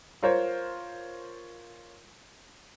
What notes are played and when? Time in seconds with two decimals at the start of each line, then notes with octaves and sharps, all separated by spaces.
0.23 F4 A#4 C5 C#5